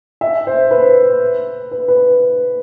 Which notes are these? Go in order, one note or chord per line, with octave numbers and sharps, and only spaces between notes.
E5
C5
B4
B4
B4